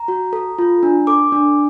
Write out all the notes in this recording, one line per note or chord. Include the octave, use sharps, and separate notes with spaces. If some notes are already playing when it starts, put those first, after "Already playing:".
Already playing: A#5
F#4
A4
F4
D4
A4 D6
D4